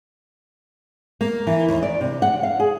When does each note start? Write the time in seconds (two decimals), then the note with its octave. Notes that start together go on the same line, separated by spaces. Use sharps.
1.21 A#3
1.47 E3
1.69 D#2
1.83 D5
2.01 C3
2.22 F#5
2.43 F5
2.60 G#4